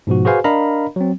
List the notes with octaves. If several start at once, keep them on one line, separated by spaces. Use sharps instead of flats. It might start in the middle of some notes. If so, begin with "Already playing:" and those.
G#2 B2 F3 F#4
F#4 G#4 B4 C5 F5 G#5
D4 A#4 D#5 F5 A#5 B5
F#3 C4